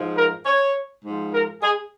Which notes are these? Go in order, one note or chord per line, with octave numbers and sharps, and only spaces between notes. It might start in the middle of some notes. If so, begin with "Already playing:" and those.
Already playing: G#2 F3
A#4
C#5
G#2 F3
A#4
G#4